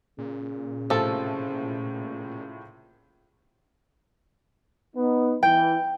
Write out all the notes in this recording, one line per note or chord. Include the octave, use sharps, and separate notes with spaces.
A#2 C#3
A2 C3 F3 F4 A4
B3 D#4
E3 G5